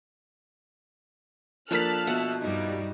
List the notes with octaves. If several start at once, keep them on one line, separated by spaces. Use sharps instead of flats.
F3 A#3 D4 A4 A5 F6 F#6 B6
B2 E5 F#5
G2 G3 D#4